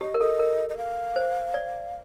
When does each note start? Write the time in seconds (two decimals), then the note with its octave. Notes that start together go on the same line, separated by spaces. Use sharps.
0.01 G4 D#5
0.14 A#4
0.20 A4 D#5
0.39 A#4
0.69 D#5
0.78 F5
1.16 C5
1.54 D5